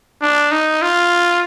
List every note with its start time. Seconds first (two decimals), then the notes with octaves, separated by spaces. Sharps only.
0.22 D4
0.52 D#4
0.82 F4